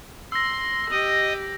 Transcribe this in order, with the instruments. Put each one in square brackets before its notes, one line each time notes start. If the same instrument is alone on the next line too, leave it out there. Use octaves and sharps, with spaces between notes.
[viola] C6 [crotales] E6 A#6
[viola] G4 [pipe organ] D#5